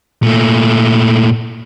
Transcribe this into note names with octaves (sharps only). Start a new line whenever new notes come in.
A#2 A3